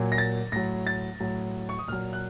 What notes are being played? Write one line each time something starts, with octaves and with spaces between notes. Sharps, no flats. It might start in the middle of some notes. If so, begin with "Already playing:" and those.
Already playing: A#2 F#3
A#6
A6
A2 F#3 A#6
A6
A2 F#3
C#6
D#6
A#2 F#3 F6
F#6